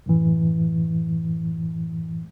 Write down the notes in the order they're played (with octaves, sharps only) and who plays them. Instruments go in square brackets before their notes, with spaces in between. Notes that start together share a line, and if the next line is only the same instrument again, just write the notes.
[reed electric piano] F#2 A2 E3